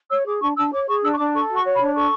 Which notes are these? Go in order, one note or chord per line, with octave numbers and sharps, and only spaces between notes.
C#5 E6
G#4 D6
D4 C#6
D4 E6
C#5 D6
G#4 C#6
D4 E6
C#6
D4 D6
A4 C#6
F#4
C#6
C#5
B5
D4
A4 C#6